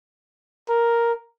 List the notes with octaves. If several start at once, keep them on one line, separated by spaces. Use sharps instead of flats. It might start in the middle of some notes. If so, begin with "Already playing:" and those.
A#4